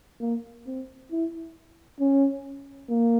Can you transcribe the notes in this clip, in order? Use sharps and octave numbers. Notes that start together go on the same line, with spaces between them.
A#3
C4
E4
C#4
A#3